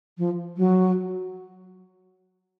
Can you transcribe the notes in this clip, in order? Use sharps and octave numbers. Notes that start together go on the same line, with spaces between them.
F3
F#3